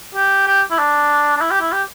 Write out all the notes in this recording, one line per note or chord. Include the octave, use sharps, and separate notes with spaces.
G4
G4
E4
D4
D4
E4
G4
E4
G4